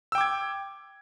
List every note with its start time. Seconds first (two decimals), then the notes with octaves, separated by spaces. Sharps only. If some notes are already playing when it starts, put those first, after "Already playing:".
0.12 E6
0.15 G5
0.18 D6
0.21 G#6